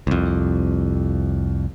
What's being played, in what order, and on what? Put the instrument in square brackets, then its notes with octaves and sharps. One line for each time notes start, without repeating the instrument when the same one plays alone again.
[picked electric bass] C2 F2